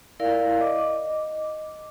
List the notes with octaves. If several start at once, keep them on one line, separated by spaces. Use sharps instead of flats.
E4 A#4 D5 F5
D#5 D6